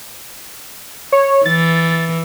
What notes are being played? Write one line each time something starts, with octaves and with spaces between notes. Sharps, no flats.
C#5
E3 A6